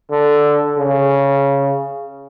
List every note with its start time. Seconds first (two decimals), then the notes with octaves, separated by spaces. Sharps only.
0.11 D3
0.78 C#3